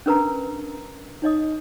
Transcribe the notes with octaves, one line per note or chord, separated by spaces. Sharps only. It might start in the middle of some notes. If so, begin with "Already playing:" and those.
C#4 D4 A#4 B4 A5 A#5
D#4 C#5 D#5 D#6